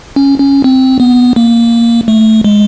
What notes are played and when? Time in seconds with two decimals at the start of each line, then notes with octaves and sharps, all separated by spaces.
0.16 C#4
0.40 C#4
0.64 C4
1.00 B3
1.36 A#3
2.08 A3
2.44 G#3